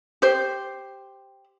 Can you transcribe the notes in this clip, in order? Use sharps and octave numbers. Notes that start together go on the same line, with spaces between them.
G4 C5